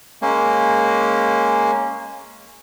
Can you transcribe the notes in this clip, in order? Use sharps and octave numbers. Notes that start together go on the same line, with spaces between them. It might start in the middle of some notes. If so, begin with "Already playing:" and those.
G#3 A#3 C#4